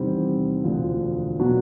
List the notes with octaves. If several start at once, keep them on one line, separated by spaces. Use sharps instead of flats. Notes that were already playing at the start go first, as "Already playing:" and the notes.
Already playing: E2 C3 D#3 G3 C4
E1 D2 D3 F3
B2 F#3 B3 D4 F#4